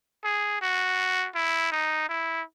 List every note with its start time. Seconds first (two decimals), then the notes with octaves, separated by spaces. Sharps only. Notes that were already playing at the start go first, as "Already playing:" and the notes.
0.24 G#4
0.61 F#4
1.35 E4
1.72 D#4
2.09 E4